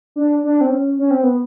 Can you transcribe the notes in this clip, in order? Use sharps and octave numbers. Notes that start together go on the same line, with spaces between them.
D4
D4
C4
C#4
C#4
C4
B3